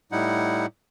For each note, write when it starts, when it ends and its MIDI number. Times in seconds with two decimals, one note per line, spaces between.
0.12 0.66 45
0.12 0.66 55
0.12 0.66 63
0.12 0.66 64
0.12 0.66 78